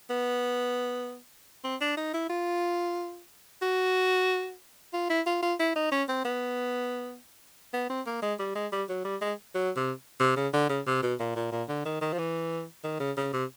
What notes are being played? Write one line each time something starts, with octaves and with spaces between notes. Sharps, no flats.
B3
C4
D4
D#4
E4
F4
F#4
F4
E4
F4
F4
E4
D#4
C#4
C4
B3
B3
C4
A#3
G#3
G3
G#3
G3
F#3
G3
G#3
F#3
C3
C3
C#3
D3
C#3
C3
B2
A#2
A#2
A#2
D3
D#3
D#3
F3
E3
D#3
C#3
C#3
C3